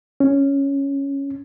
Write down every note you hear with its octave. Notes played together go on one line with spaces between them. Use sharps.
C#4